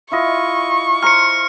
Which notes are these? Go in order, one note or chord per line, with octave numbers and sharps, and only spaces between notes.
E4 F4 D#5 C#6
C5 A#5 C6 F6 C#7